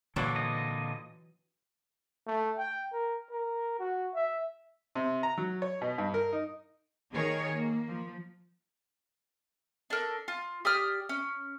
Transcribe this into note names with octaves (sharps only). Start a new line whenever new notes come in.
A#2 D3 E3 F#3 D4
D#5
A3
G5
A#4
A#4
F#4
E5
C3
A#5
F#3
C#5
B2
G2
A#4
D#4
D#3 D#4 G#4 A#4 C#5
A#3
F3
D4 A4 A#4
F4
G4 D5 D#6 F6
C#4